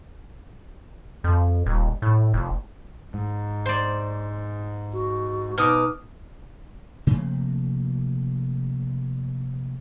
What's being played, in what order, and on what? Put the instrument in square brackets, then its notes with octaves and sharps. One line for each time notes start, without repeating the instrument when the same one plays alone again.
[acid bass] F2
D#1
A2
F1
[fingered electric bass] G#2
[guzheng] C5 D5
[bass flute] F#4
[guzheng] B2 [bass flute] D#4 [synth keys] D6 D#6 F6
[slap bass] C3 F3 A3 A#3